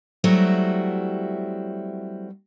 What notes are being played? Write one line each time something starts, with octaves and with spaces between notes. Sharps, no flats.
F#3 G3 A3 C4 E4 F#4